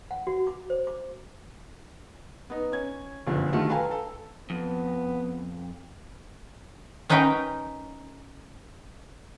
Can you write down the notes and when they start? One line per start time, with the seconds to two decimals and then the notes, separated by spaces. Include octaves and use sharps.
0.11 F#5
0.27 F#4
0.47 D6
0.70 C5
0.87 D6
2.50 B3 D#4
2.72 C#4 G#6
3.27 F#1 G2 B2 D3 F3
3.53 D3 D#3 G3 A3 F4 F#4
3.69 A4 B4 F5 G5 G#5 A#5
3.91 A4
4.50 F2 B3
7.10 C#4 D#4 A#4 B4 G5